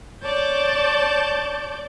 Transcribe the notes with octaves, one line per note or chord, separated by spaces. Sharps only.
C#5 D5 A5 G6